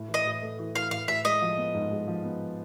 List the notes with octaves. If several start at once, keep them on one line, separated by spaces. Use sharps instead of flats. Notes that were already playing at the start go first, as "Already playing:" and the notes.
Already playing: A2
E3
D#5
A2
A3
E3
E3 F5
A2 F5
A2 E5
G#3 D#5
F3
B3
G#2
G#3
F3
B3